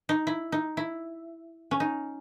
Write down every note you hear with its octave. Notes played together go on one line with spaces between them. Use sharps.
D#4
E4
D#4
E4
C#4
D#4